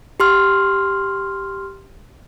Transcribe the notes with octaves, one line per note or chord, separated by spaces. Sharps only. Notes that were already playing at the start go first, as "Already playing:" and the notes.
G4 C6 F6